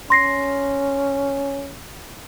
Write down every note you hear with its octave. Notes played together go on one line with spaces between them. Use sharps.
C#4 C6 A#6 C7